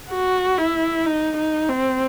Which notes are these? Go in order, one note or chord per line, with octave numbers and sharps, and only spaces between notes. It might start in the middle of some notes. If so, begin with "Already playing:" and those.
F#4
E4
D#4
D#4
C4